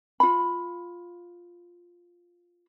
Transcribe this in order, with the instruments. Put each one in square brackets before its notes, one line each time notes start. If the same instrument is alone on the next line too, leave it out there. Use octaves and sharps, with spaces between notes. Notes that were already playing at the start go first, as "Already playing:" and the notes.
[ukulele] F4 B5